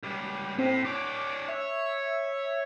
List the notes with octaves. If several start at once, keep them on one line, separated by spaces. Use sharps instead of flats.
C#2 G3
A2 C4
D4 C#5 D6
C#5 E5